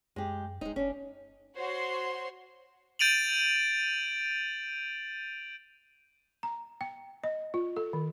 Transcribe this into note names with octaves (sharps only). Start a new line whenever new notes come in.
F#2 G#3 G4
D1 G#3 D#4
F1 C#4 D4
F#4 C5 C#5 C6
G6 A6 D7 D#7 F7 F#7
A#5
G5
D#5
F4
A4
D#3